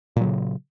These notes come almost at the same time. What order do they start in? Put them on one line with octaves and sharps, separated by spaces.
A#2 F#3 C#3